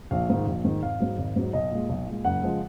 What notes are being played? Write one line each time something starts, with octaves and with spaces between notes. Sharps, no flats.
A#1 F5
G#2 D#3
A#1
G#2 D#3
G#1 F5
G#2 F#3
G#1
G#2 F#3
B1 D#5
A#2 G#3
B1
A#2 G#3
F#1 F#5
C#3 F3 G#3